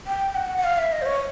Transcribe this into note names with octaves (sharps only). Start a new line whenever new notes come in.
G5
F#5
F#5
F5
E5
D#5
C5
C#5